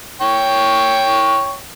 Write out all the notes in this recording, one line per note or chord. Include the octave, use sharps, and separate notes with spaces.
C#5 G5 C#6